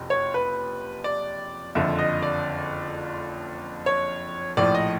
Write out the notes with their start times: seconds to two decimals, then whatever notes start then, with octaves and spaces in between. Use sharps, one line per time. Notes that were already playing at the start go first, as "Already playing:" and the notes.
Already playing: F#1 F2 C3 F3
0.10 C#5
0.34 B4
1.04 D5
1.75 F#1 F2 D3 F3 E5
1.99 D#5
2.22 D5
3.86 C#5
4.57 A#1 A2 F3 D5
4.75 D#5